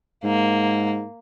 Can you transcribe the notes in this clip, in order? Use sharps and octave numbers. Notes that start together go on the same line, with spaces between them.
G#2 A#3